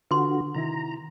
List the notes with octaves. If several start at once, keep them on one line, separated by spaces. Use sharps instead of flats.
D3 F4 F#4 B4 C6
C3 D#3 E4 A#5